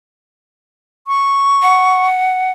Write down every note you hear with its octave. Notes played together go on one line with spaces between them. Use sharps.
C#6
F#5